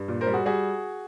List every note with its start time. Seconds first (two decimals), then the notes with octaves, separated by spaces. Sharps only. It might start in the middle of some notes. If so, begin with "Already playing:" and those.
Already playing: G2
0.08 A#2
0.21 A#4 C5
0.27 G3
0.33 F#4 G#4
0.45 G3 F#4 G#4